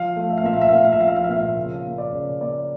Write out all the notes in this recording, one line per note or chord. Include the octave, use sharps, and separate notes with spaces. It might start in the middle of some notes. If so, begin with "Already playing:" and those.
Already playing: F3 F5
A3
E5
F5
A#2 E5
F5
E5
F5
A#2 E5
F5
E5
F3 F5
E5
F5
E5
A#2 F5
E5
C#3 F5
A#3
D5
C#3
A#3 D5